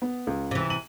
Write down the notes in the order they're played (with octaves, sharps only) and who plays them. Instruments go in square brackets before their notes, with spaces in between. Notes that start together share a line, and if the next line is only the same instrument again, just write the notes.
[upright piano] B3
C#2
[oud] C3 E3
[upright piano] D#7 F#7